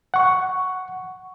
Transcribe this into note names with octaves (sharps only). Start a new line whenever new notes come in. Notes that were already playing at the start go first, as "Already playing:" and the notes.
F#5 C#6